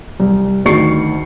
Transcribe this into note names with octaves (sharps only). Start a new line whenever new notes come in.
C2
D2 D#3 C#6 C7 C#7